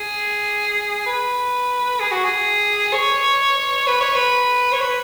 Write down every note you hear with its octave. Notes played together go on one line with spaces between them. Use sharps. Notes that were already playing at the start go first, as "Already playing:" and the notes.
Already playing: G#4
B4
G#4
F#4
G#4
C#5
B4
C#5
B4
C#5
B4